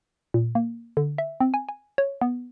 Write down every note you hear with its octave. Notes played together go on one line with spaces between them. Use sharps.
A#2
A#3
D3
E5
C4
G#5
G#5
C#5
B3